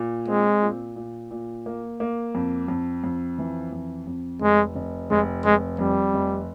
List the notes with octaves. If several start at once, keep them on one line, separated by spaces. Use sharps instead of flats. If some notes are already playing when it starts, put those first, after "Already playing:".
Already playing: A#2
G#3 C4
A#2
A#2
A#2
A#3
A#3
F2
F2
F2
E3
F2
F2
F1 G#3
F1
F1 G#3
F1 G#3
F2 G3
F1